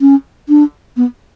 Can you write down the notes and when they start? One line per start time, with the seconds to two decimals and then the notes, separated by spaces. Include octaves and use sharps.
0.01 C#4
0.49 D4
0.97 B3